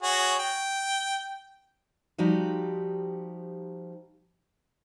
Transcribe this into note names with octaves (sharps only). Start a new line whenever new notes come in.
F#4 G#4 C#5
G5
F3 G3 D#4 F#4 G4